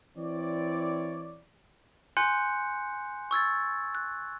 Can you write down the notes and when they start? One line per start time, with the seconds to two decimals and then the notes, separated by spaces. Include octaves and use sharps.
0.17 E3 C4 E4 C#5 D5
2.17 G#5 C6 F#6 G6 C#7
3.31 C#6 E6 G#6 A6
3.95 F#6